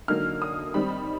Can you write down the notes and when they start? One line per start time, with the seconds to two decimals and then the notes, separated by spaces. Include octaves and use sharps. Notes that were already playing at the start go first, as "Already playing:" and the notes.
0.08 D3 F#3 A#3 D#4 F6
0.42 D#6
0.74 D#3 G3 C4 B5